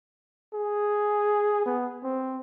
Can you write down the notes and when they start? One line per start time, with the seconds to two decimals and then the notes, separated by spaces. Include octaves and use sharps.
0.54 G#4
1.66 B3
2.03 C4